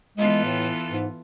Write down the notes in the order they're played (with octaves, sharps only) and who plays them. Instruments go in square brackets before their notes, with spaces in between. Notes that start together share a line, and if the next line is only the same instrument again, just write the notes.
[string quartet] E3 B3 F4 A4 [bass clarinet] G#3
[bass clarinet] A2
G#2